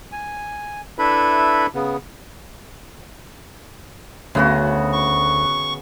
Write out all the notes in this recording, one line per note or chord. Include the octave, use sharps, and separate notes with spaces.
G#5
D4 E4 A4 B4 E5 B5
C#3 B3
D2 C#3 B3 F#4
C#6